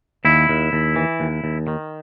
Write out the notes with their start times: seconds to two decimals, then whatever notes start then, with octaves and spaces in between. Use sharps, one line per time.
0.25 D#2 E4
0.49 D#2
0.73 D#2
0.96 E3
1.20 D#2
1.44 D#2
1.68 D#3